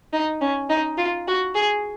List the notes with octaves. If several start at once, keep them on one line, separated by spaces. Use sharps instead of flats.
D#4
C#4
D#4
F4
F#4
G#4